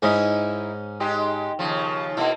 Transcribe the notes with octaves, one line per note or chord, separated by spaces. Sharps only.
G#2 C#4 D#4 E4 D#5
G#3 D#4 G4
D#2 C#3 F3
B2 A#3 E4